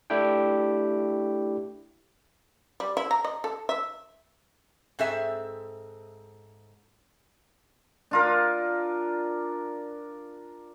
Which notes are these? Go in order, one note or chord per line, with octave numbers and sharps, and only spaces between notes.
A3 D4 E4 G4 G5
G3
E4
A#5
D#5
A4
E5
G#2 C4 G#4 A4 E5
D4 F4 A#4